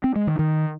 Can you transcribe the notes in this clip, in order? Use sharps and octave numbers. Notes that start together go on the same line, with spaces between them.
C4
G#3
D#3
D#3